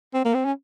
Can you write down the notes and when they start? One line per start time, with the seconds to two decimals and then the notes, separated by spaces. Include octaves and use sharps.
0.14 C4
0.25 A#3
0.34 C4
0.45 C#4